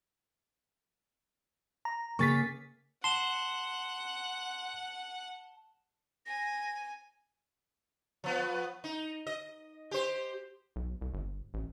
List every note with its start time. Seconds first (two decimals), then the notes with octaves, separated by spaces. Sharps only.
1.85 A#5
2.19 C#3 A#3 G#4 C#6 A6 B6
3.04 F#5 A5 C6 E7 G7
6.26 G#5 A#6
8.24 F3 B3
8.84 D#4
9.27 D#5
9.91 G4 C5
10.76 B1
11.01 C2
11.14 G1
11.54 A1